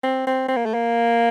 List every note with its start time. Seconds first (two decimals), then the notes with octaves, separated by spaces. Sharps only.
0.03 C4
0.27 C4
0.48 C4
0.57 A#3
0.65 A3
0.74 A#3